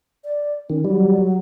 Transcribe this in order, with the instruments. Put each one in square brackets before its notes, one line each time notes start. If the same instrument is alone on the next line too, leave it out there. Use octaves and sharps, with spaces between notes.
[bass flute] D5
[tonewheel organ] D#3 [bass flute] C#4
[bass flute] F#3 [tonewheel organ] G3